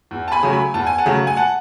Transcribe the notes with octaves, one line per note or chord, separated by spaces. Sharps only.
E2
A5
G#5 B5
C#3 F#3 A3
G#5 B5
E2 A5
G#5
F#5 A5
C#3 F#3 A3
G#5
F#5 A5